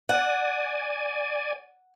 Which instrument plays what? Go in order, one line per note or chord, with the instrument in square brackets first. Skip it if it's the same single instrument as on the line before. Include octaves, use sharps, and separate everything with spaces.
[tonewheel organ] D5 G#5 [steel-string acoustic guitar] F#5